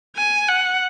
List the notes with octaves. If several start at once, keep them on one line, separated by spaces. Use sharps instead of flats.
G#5
F#5